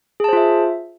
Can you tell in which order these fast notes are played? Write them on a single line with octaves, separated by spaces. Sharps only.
G#4 A5 C5 F4 E5